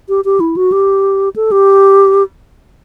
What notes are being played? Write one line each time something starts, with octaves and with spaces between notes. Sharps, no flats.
G4
G4
E4
F#4
G4
A4
G4